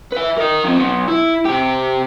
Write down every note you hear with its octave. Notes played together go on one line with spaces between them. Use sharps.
B4 E5
A#4 D#5
F3 C4
B2 F#3
E4
C3 G4